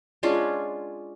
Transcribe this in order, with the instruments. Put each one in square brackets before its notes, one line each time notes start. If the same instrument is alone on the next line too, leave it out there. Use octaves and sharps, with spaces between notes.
[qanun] G#3 C#4 D4 F4